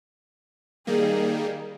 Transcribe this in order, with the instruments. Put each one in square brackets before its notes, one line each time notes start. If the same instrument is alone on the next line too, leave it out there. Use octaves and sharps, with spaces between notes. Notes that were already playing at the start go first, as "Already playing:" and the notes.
[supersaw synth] D#3 G3 A#3 [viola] G#4